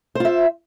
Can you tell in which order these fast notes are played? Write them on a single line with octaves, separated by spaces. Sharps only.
C5 F4 E5